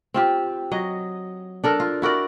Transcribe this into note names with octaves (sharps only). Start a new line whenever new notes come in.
C4 F4 G4
F#3 D#5
D4 A4 A#4
F4
E4 F#4 A#4 D5